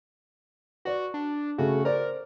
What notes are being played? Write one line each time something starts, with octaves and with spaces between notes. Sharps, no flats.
F#4 B4 D5
D4
C#3 A3 F#4
A#4 C5 D5